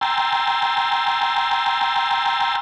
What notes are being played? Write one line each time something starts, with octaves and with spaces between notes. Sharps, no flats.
G5 G#5 A#5 C6 E6 A6